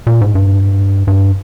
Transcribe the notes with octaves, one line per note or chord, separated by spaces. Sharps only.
A#2
G#2
G2
G2